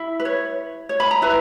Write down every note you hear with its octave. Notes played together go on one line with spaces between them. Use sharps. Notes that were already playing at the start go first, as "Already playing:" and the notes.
Already playing: E4
B4
C#5
C#5
B5
A#5
E4 B4